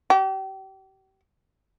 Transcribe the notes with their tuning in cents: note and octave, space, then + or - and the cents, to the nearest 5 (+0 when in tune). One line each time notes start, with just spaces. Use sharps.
G4 -35